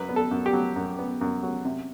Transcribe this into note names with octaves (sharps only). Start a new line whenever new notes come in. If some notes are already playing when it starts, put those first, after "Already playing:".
Already playing: F#2 B4
B3
A4
F#2
G4
F#3
F#2
B3
F#2
F#3
C3